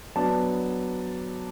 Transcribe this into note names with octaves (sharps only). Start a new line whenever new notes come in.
F#3 B3 D4 A5